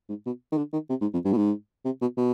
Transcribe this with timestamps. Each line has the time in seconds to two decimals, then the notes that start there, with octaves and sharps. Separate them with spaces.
0.09 G#2
0.26 B2
0.52 D#3
0.58 D3
0.73 D#3
0.90 C3
1.01 G#2
1.13 F2
1.25 G2
1.33 B2
1.37 G#2
1.85 C3
2.01 B2
2.17 B2